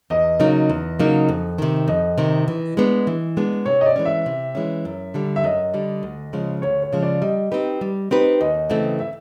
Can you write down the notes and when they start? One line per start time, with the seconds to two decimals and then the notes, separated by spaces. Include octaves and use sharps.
0.10 E2 D#5
0.40 C#3 F#3 A#3 D#4
0.70 E2
0.99 C#3 F#3 A#3 D#4
1.29 F2
1.58 C3 D#3
1.88 F2 D#5
2.18 C3 D#3
2.48 E3
2.77 G#3 B3 D4
3.07 E3
3.37 G#3 B3 D4
3.66 C3 C#5
3.81 D#5
3.86 D5
3.96 E3 G#3 C#4
4.05 E5
4.26 C3
4.55 E3 G#3 C#4
4.85 F#2
5.14 D3 G3
5.36 E5
5.44 F#2 D#5
5.74 D3 G3
6.03 D2
6.33 C#3 F3 G#3
6.62 D2 C#5
6.82 C#5
6.93 C#3 F3 G#3
7.02 D5
7.22 G3 D#5
7.52 C4 D#4 G4 B4
7.81 G3
8.11 C4 D#4 G4 B4
8.40 D#2 D#5
8.70 C#3 E3 A3 C4
9.00 E5